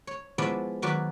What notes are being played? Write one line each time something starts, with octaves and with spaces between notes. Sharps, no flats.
C#5
F3 G#3 B3 E4 F#4 D5
D#3 F#3 F#4 B4 D5